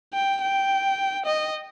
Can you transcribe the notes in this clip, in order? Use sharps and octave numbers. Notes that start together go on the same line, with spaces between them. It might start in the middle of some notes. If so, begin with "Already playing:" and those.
G5
G5
D#5